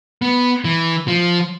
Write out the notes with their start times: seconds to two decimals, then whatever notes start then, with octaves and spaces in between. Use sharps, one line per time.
0.22 B3
0.65 E3
1.08 F3